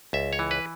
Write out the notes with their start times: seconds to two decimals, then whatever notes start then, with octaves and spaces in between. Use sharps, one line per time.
0.13 C#2 E5
0.33 C#5
0.39 E3
0.51 B4